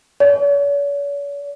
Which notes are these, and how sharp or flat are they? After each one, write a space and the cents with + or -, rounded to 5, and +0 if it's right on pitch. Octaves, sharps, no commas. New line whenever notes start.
C#5 +45